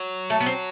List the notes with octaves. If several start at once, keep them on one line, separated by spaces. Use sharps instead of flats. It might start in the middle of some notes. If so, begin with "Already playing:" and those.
Already playing: F#3
A3
B3
C4